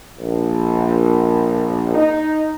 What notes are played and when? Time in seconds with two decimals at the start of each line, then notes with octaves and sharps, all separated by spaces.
0.18 A#1
1.94 D#4